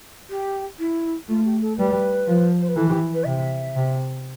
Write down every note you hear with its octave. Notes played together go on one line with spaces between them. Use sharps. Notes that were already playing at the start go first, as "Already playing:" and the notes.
G4
E4
A3 F4
G4
A4
G3 B4
F3
C5
B4
E3 A4
G4
B4
C3 E5
C3